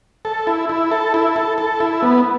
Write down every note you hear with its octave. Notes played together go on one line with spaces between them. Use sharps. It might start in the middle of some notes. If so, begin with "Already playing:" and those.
A4
E4
E4
A4
E4
A4
A4
E4
B3